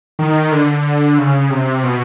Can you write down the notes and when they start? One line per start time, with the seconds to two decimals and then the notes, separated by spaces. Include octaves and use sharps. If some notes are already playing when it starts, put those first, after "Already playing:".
0.19 D#3
0.52 D3
1.18 C#3
1.50 C3
1.84 B2